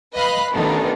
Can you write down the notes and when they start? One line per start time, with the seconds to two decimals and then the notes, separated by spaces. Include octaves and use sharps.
0.14 B4 D#5 F5 B5 F#6
0.53 A1 B2 D#3 D4 D#4